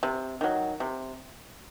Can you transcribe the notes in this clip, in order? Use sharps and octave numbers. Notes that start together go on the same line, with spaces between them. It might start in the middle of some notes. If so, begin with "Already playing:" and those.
C3
D#3 F#3
C3